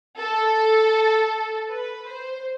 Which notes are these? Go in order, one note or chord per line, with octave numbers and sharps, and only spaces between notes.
A4
B4
C5